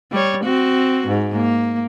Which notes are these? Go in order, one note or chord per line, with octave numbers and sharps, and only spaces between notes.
G3 C#5
C4 F#4
G#2
A#3